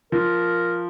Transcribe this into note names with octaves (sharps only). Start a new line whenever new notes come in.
F3 A#4